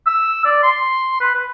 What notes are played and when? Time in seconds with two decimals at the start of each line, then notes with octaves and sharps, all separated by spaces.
0.06 E6
0.45 D5
0.63 C6
1.20 B4
1.35 B4